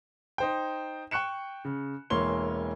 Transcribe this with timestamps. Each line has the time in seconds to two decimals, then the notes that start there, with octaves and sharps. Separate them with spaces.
0.38 D#4 C5 G5
1.11 G5 C#6 F#6 C#7 E7
1.65 C#3
2.10 E1 E3 A#3 C#5 C6 G7